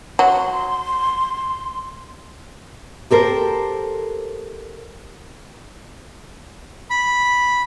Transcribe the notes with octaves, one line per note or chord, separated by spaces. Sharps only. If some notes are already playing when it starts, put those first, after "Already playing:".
F#3 C6
G4 A4 A#4 C5
B5